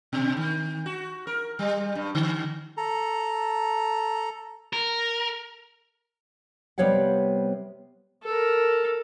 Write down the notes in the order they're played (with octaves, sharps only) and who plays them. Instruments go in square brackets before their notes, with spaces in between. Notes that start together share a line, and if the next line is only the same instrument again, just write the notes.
[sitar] B2
D#3
F#4
A#4
G3
G2
D3
[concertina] A4 A#5
[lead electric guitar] A#4
[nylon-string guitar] C3 G3 B3 C#5 F5 F#5
[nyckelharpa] A4 A#4